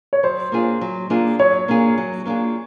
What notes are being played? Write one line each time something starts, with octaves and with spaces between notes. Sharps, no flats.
C#5
F#3 C5
A#3 D4 F4 G#4
F#3
A#3 D4 F4 G#4
F#3 C#5
A#3 D4 F4 G#4
F#3
A#3 D4 F4 G#4